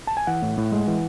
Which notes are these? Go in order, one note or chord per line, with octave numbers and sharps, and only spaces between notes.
A5
G#5
E3 F#5
A2
A2
G#3
E3